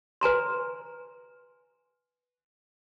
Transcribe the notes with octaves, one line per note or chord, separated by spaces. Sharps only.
B4 G#5 A#5 C6